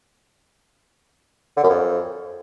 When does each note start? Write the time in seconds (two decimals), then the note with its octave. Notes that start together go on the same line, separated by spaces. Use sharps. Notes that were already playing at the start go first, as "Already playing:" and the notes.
1.57 D3
1.63 F#2
1.69 F2